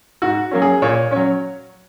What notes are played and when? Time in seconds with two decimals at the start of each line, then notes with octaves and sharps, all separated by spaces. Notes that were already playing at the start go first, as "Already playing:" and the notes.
0.22 G#2 F#4
0.51 F#3 A#3 C#4
0.62 G#4
0.82 A#2 C#5
1.11 F#3 C#4 C#5